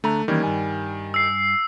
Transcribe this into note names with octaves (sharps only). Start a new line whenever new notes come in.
D2 A3 D4 A#5
D#3 E3 G3 A#3 C#4
G2 G#5
E6 C7